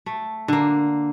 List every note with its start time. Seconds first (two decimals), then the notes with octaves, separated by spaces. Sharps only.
0.06 A3
0.48 D3 A#3